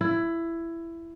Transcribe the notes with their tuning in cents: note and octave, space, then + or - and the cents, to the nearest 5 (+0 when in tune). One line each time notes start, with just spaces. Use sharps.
E4 +15